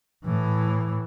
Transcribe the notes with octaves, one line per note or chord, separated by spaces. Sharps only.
A2 E3